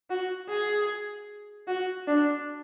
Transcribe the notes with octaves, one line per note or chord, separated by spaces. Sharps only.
F#4
G#4
F#4
D4